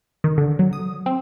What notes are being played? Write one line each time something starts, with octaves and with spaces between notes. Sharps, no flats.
D#3
D3
F#3
D#6
C4